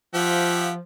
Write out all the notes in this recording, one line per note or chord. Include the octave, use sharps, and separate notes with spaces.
F3 G4 E5 F#5